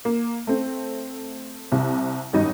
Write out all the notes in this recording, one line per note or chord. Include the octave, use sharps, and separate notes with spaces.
A#3
A3 C4
C2 C3
G#1 F#2 G3 D#4 D#5